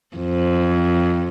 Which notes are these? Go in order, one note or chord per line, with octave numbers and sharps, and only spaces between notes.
F2